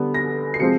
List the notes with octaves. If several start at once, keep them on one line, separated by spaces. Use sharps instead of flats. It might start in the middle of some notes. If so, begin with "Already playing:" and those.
Already playing: D3 G3 B3
A#6
C7
C3 F3 G#3 C4 C#7